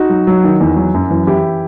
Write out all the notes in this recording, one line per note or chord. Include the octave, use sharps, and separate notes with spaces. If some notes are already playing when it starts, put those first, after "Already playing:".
Already playing: D#4 F#4
F#3
F#3
D#3
E2
F#3
F#2
E3
E3 E4 G4